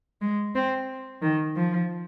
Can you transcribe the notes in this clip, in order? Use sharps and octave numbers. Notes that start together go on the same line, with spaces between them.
G#3
C4
D#3
F3